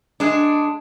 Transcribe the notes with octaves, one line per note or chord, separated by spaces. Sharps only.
G#3 D4